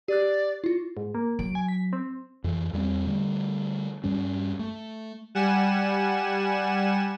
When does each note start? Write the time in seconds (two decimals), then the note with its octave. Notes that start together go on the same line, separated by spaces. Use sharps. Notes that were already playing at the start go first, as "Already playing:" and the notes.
0.08 G4 D5 F#6
0.64 E4 F4
0.97 G#2
1.15 A#3
1.39 F#3 D7
1.55 G#5
1.68 B6
1.93 C4
2.44 F2 E3
2.73 E2 G3 B3 C4
3.06 D3 G3 A3
4.04 G2 G3 C#4
4.59 A3
5.35 G3 F#5 G#5 E7